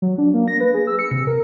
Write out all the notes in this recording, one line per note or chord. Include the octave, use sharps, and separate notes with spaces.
F#3
D4
A#3
A#6
B4
G#4
E6
C#7
C3
A#4